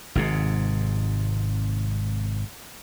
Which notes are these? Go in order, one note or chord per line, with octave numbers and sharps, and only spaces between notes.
G#1 G#2 C3